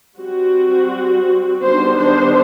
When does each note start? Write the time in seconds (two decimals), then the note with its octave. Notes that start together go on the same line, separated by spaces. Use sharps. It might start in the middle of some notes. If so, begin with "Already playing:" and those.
0.17 G3 C4 F#4
1.62 D#3 G3 B3 D4 C5
1.99 C5